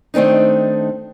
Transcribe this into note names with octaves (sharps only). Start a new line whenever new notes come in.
D#3 A3 C4 D4 D#4